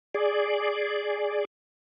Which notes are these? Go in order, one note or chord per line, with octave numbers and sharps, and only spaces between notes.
G#4 D5